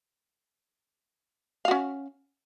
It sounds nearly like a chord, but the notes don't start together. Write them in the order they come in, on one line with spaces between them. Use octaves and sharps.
F5 F#4 C#4